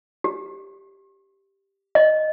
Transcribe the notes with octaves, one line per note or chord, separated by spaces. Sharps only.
G4
D#5